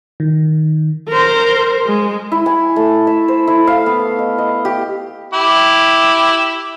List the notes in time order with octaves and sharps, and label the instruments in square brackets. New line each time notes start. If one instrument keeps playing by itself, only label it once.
[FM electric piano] D#3
[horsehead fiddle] A#4 C5
G#3
[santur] E4
G#5
A3
E5
C5
E4
F5
B3
F5
D#5
D#5
G4
[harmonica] E4 G4